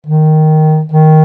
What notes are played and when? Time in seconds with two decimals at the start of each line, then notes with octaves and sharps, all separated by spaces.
0.06 D#3
0.91 D#3